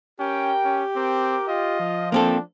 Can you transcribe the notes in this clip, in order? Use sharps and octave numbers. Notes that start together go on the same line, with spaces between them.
C#4 G4 A#4 G5
C#4
C4 A#4 D6
F4 D#5
F3
A#3 C4 D4 A4